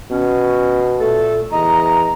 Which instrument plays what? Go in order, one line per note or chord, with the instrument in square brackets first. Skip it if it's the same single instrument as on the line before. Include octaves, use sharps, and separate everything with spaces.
[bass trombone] B2 [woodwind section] C#4
[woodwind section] A#2 A3 A4
[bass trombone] E2 [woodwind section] D#5 A#5